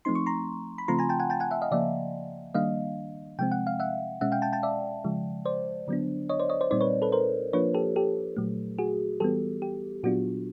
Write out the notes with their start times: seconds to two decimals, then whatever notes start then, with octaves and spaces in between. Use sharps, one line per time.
0.05 F3 A3 C4 D#4 C6
0.15 C#6
0.26 A#5 C6
0.78 B5
0.88 C#3 F3 A3 C4 F4 A#5 C6
0.99 G#5 A#5
1.09 G5 A5
1.19 F#5 G#5
1.30 G5 A5
1.40 F#5 G#5
1.51 E5 F#5
1.62 D#5 F5
1.71 C#3 F3 A#3 D5 E5
2.54 D#3 G3 A#3 D4 D#5 F5
3.39 C3 F3 G#3 C4 G5
3.52 F#5
3.67 F5
3.80 E5 F#5
4.21 B2 G#3 C#4 E5 F#5
4.32 F5 G5
4.42 G5 A5
4.53 G5 A5
4.63 D5 E5
5.04 C#3 F3 G#3
5.45 C5 D5
5.88 D3 F#3 B3 D4
6.29 C#5 D#5
6.39 C5 D5
6.49 C#5 D#5
6.61 C5 D5
6.71 A#2 G3 C4 D#4 C5 D5
6.81 B4 C#5
7.02 A4 B4
7.12 A#4 C5
7.53 F3 A#3 D4 F4 B4 C#5
7.74 G4 A4
7.96 G4 A4
8.37 A#2 F#3 A3
8.78 F#4 G#4
9.20 E3 G3 B3 G4 A4
9.62 G4
10.03 A#2 F#3 B3 D4 F4 F#4